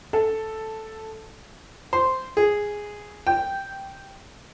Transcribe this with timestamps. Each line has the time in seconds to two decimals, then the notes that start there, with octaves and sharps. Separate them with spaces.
0.13 A4
1.93 C5
2.37 G#4
3.27 G5